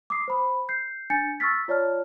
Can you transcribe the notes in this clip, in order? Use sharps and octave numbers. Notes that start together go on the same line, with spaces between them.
D6 D#6 C7
C5 B5
G6 C7
D4 G#5 G6 A6 C#7
C#6 E6 F6 A6 B6
F4 C#5 D5 A5 F6